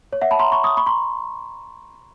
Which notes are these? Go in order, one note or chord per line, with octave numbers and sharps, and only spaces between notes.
C#5
E5 F#5
A5 B5
A#5 C6
B5 C#6
C#6 D#6
B5 C#6
A#5 C6